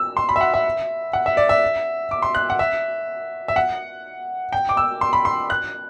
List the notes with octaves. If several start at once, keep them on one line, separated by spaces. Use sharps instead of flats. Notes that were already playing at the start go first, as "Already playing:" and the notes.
Already playing: E6
C6
B5
E5
F#5
E5
F#5
E5
D5
E5
D6
C6
F#6
F#5
E5
E5
F#5
G5
D6
E6
C6
B5
C6
F#6